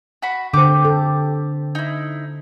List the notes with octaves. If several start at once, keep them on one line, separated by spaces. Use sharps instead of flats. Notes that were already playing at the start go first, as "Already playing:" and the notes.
F#4 B5
D3 G4 C5 D6
A4
D#4 E4